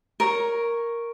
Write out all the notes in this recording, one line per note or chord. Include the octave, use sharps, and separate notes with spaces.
A#4 C#5